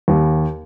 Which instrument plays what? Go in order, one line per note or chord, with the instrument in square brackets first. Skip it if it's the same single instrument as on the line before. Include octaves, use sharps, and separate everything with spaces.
[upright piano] D#2